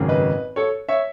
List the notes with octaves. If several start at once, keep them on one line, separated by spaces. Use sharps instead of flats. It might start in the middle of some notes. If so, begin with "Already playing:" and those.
Already playing: G#1 F#2 C#3
B4 D#5
A4 C#5
C#5 E5